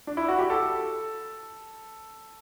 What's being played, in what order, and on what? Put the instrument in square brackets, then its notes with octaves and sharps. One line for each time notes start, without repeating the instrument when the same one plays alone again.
[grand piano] D4
E4
F#4
G4
A4